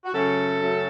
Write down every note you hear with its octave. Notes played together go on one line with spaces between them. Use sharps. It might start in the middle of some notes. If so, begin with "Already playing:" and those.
F#4
F#2 C#3 F#3 A3 C#4 A4
F#2 C#3 F#3 A3 C#4